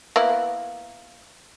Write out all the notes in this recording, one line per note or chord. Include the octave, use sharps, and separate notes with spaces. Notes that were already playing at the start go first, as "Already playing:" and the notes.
A#3 B3 E4